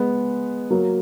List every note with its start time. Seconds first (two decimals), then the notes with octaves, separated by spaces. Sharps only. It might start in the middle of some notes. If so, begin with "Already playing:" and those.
Already playing: G#3 B3
0.70 F#3 A#3